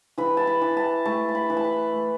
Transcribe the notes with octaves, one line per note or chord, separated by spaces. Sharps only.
E3 B5
A5
B5
E3
A5
A3 A5
A5
B5
E3
A5
B5
A3